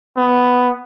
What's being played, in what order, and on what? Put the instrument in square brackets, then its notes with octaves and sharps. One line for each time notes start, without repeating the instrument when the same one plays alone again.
[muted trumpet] B3